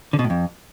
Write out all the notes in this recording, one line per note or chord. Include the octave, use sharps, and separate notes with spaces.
D3
B2
A2
F2